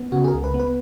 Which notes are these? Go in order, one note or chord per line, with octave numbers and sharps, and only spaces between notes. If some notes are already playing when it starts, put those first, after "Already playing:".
Already playing: B3
C#3 F#4
G#4
A#4
C#2
B4
B3
B4